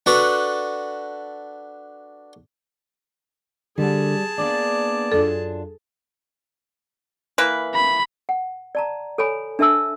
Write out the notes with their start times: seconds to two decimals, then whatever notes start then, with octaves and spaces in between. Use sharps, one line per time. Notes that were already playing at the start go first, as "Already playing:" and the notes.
0.06 D4 F#4 A4 B4
3.78 D3 G3 G#4 D5 A5
4.38 A#3 B3 D4 D5
5.12 F#2 D4 F4 A4
7.38 E3 A#3 B4
7.75 B5
8.29 F#5
8.75 D5 A5 A#5
9.18 A4 C#5 G#5 B5
9.59 D4 A4 E5 A5 E6